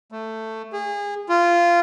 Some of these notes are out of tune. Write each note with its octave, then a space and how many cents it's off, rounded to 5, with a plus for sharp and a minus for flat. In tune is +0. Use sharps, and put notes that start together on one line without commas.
A3 +10
G#4 -30
F4 -15